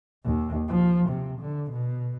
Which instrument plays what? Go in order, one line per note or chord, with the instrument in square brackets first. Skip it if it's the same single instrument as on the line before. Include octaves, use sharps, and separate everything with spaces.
[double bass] D#2
F3
C3
D3
B2